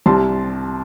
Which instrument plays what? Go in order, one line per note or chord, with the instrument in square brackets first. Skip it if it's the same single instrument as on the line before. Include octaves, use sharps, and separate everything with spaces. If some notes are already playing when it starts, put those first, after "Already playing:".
[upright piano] C2 C3 G3 A5 C6